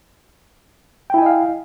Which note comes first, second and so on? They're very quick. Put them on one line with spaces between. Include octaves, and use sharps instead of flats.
G5 E4 G#5 D#5 F5